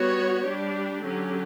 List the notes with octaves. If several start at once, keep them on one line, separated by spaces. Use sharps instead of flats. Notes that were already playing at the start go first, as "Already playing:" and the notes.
Already playing: G3 B3 F#4 C#5
G3 D4 G4
D3 F#3 C#4 G4